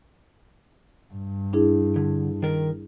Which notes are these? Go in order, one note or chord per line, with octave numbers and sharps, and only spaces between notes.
G2
D4 E4 G#4
D3
D#3 A#4